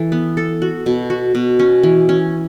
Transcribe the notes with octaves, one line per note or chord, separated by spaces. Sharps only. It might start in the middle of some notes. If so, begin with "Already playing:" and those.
Already playing: E3 A4
B3
A4
F#4
B2
F#4
B2
C#4
E3
C#4